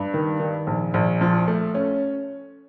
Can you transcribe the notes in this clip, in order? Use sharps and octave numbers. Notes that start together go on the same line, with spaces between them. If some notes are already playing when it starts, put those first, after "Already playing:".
Already playing: G2
D#3
D#3
A#1
A#1
F3
A3
C#4